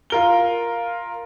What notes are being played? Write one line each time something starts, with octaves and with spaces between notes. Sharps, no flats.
F4 A#4 G7